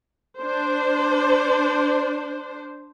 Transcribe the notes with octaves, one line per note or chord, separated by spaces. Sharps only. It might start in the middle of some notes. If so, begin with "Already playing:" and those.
D4 C5